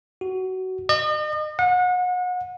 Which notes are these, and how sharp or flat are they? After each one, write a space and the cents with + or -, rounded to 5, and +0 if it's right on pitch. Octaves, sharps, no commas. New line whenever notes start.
F#4 +20
D#5 -40
F#5 -35